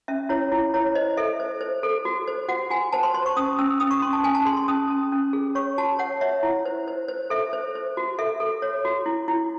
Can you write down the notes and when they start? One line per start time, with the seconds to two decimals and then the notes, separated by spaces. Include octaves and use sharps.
0.08 C#4 E5
0.29 E4 C#5
0.52 E4
0.74 E4 C#5
0.95 C5 D#5
1.17 A4 E5
1.40 C5
1.61 C5
1.83 A4
2.05 F#4
2.28 C5
2.49 F#4 F#5
2.70 F#4 G#5
2.92 C5 A5
3.03 C6
3.14 C5 C6
3.26 C#6
3.37 C#4 D#6
3.59 C#4 E6
3.80 C#4 D#6
3.91 C#6
4.02 C#4 C6
4.13 A5
4.24 C#4 G#5
4.35 A5
4.45 G#4 C6
4.57 C6
4.68 C#4 D#6
4.90 C#4
5.12 C#4
5.33 G#4
5.55 C#5 C#6
5.78 F#4 A5
5.99 C#5 F#5
6.21 C#5 E5
6.43 E4
6.65 C5
6.88 C5
7.08 C5
7.30 A4 E5
7.53 C5
7.75 C5
7.97 F#4
8.18 A4 E5
8.40 A4
8.62 C#5
8.85 F#4
9.06 E4
9.28 E4